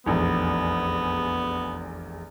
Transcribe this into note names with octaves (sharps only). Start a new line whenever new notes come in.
F1 A#1 E2 B3